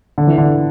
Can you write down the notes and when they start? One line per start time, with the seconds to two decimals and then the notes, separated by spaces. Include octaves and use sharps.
0.18 D3
0.27 E3
0.38 D3